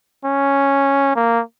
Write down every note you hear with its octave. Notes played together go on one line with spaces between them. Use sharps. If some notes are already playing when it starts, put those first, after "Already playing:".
C#4
A#3